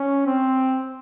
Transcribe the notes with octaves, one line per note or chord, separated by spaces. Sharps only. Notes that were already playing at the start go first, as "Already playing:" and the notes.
Already playing: C#4
C4